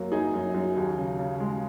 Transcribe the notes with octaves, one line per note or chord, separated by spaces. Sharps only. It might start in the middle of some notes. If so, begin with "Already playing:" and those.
Already playing: F#2 F#3 A#3
F#2 D#4 G#4
F#2
F#2
D#2
C#3
C#3
G#3